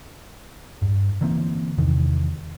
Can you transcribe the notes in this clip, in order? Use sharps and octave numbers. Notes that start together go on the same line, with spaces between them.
G2
D3 E3 A#3 C4
E2 C3 D#3 E3